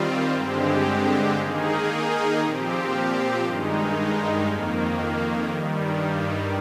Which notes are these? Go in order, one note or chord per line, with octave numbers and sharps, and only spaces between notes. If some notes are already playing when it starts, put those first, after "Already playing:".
Already playing: D#3 G3 C4 F4
G2 D3 G#3 C4 G4
D#3 A#3 D#4 G#4
A#2 F3 C4 G4
G2 D#3 G#3 D#4
F2 D#3 A#3
G2 D#3 G3